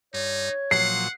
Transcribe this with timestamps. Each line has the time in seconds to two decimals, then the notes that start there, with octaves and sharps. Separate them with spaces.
0.14 G2 D#4 C#5
0.71 A#2 F3 F#3 F#5 C7